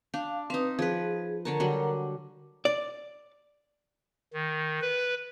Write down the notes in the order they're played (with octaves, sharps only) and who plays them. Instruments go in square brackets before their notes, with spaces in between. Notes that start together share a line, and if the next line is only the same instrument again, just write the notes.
[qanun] D4 [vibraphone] F5
[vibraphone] C4 B4 D#6 [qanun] D#4 F5
[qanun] F3 B4 [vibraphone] G#4
[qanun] D3 C#5 A5 [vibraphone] A#4 A#5
[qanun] D3 F#3 G3
[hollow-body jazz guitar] D5
[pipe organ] D#3
B4